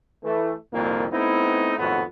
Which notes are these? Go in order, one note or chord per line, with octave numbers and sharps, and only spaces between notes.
E3 A3
C2 F2 A#2 D#3 A#3
A3 B3 C4 D#4 E4
G#1 F2 A2 B3 F#4 A4